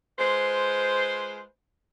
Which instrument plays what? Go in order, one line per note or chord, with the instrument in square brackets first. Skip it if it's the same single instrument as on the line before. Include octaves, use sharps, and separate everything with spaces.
[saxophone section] G#3 F4 B4 C5